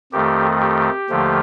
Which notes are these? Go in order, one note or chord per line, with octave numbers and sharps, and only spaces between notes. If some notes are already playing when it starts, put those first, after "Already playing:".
F2 D#3 A3 G4
G4
D#2 D3 F3 A3